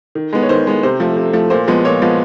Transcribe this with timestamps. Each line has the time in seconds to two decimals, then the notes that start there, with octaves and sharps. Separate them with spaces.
0.15 D#3
0.33 G#3 B3
0.43 C#5
0.49 D#3 C5
0.67 G#3 B3
0.83 C3 C5
1.00 F3 A3
1.17 C3
1.33 F3 A3
1.50 A#2 C5
1.68 F3 G#3 B3
1.85 A#2 C#5
2.02 F3 G#3 B3